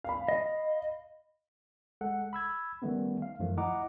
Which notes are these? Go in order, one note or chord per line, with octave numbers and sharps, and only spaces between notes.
F5 B5
D#5
G#3 A4 F#5
B5 E6 G#6
D#3 G3 A3 B3 C#4
F5
F#2 D#3 F3 A3
E4 D#5 F#5 A#5 D6